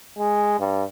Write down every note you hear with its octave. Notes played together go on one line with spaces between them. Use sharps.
G#3
G2